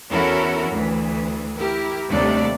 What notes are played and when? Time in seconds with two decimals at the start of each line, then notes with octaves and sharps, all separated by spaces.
0.10 E2 C#4 E4 F#4 A4 A#4
0.71 D2 E3
1.58 E4 G4 A#4
2.08 D#2 C3 G3 A3 D4 D5